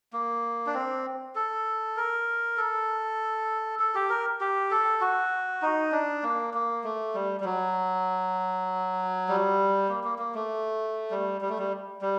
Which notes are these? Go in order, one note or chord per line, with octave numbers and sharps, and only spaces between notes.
A#3
D4
C4
A4
A#4
A4
A4
G4
A#4
G4
A4
F#4
D#4
D4
A#3
A#3
A3
G3
G3
F#3
G3
A#3
A#3
A#3
A3
G3
G3
A3
G3
G3